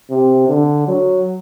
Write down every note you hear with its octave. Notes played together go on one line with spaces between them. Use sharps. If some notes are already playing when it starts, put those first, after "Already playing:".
C3
D3
F#3